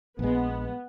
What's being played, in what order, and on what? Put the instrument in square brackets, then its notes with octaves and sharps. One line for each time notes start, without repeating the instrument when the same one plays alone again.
[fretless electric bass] A#1 G#3 [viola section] B3